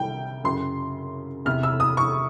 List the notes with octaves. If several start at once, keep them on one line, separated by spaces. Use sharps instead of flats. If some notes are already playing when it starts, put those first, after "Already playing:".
Already playing: C2 C3 D#3 G3 G5
F#2 C#3 F#3 C6
E2 C3 E3 F6
E6
D#6
C#6